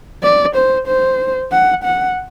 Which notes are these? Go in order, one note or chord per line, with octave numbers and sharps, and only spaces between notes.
D5
C5
C5
F#5
F#5